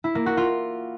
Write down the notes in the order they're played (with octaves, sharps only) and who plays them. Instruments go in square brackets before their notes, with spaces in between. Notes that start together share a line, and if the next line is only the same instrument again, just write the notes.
[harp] E4
A#3
F#4
F4